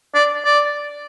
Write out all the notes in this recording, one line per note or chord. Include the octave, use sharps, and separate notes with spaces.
D5
D5